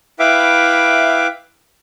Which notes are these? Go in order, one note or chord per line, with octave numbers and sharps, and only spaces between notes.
E4 B4 E5 F5 G5 D6